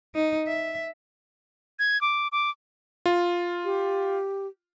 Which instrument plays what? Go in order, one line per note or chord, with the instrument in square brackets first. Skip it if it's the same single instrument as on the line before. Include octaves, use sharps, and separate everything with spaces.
[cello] D#4
E5
[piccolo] G#6
D6
D6
[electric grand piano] F4
[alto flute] G4